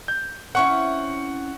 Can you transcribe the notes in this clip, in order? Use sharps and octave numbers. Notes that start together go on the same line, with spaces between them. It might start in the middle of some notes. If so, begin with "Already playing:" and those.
G6
C4 C#4 E4 F#5 C#6